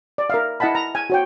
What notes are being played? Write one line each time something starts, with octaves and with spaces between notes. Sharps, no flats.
D5
A#4 E5 F5
E4 D#5 F#5 A5 B5
A#5
G#5
F#4 C#5 G5